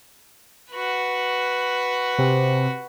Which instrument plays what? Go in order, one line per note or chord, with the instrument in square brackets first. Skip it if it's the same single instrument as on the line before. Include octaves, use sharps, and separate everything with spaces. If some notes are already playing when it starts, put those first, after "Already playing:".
[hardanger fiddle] F#4 B4
[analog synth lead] C3